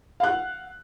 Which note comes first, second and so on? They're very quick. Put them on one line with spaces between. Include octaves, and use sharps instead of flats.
F5 F#6 F#5